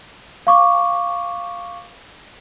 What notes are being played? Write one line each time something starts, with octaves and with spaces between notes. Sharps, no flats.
F5 C#6 D6